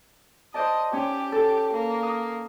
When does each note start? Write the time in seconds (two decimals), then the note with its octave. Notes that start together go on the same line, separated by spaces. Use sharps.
0.54 C5 D5 D#5 A5
0.93 C#4 G4
1.32 A4
1.73 A#3
2.03 D#6